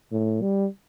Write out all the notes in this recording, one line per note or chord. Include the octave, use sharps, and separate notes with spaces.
A2
G3